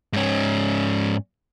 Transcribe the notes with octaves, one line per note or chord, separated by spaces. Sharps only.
G#2 C#4